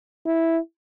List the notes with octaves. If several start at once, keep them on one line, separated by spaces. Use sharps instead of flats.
E4